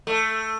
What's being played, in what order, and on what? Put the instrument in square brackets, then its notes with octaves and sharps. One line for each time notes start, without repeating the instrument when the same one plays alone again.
[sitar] A3